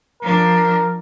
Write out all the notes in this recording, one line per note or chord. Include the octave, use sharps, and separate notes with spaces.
F3 D4 A#4